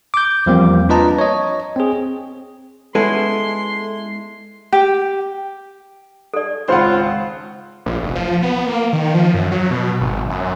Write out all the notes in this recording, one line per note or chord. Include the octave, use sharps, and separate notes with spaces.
D6 G6
E2 F3 G3 A#3 C4
D4 F4 B4 D#5 A5 A#5
C#5 D#5
C4 G#4
G#3 B3 C#4 E4 A4 B4 C6
G4
A4 D5
G#1 C#2 F4 C5 C#5 F#5 B5
A#1
F1
F3
B3
A#3
D#3
F3
F#2
F#3
B2
G#1
F#2